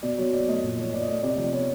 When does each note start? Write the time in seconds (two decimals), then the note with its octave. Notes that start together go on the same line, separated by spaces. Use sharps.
0.03 B2 D5
0.18 F#3 C#5
0.33 B2 D5
0.48 A3 D#5
0.63 A#2
0.78 F3 C#5
0.93 A#2 D5
1.02 D#5
1.08 A3 D5
1.19 C#5
1.23 C3 D5
1.38 F3 D5
1.53 B3 C#5